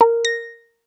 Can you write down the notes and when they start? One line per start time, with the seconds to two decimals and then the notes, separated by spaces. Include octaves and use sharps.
0.01 A#4
0.25 A#6